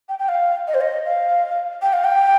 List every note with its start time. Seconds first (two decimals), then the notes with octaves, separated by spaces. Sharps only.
0.09 G5
0.19 G5
0.29 F5
0.67 D#5
0.74 C5
0.81 D#5
1.06 F5
1.82 G5
1.93 F5
2.04 G5